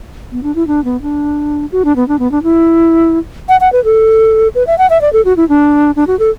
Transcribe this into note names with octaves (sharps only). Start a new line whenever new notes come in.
B3
D4
E4
D4
B3
D4
F#4
D4
B3
D4
B3
D4
E4
F#5
F#5
B4
A4
B4
E5
F#5
E5
D5
A4
F#4
E4
D4
D4
F#4
A4